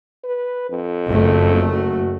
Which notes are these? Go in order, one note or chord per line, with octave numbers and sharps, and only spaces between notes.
B4
F2
F#1 A3
F#4